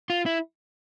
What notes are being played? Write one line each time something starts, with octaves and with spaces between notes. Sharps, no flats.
F4
E4